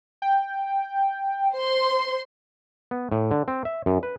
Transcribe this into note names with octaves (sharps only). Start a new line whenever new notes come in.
G5
C5 C6
B3
A2
D3
C4
E5
F#2
B4